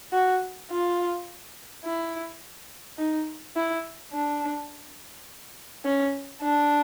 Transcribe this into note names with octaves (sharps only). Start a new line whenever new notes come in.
F#4
F4
E4
D#4
E4
D4
C#4
D4